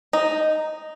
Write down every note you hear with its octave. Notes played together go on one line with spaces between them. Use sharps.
D#4